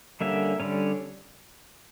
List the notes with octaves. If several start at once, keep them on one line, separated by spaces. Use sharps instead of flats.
D3 G3 A#3 C#4 E5
D3 G3 C#4